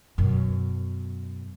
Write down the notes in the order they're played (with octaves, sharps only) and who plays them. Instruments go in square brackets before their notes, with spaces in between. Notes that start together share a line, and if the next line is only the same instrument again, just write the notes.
[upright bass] F#2 B2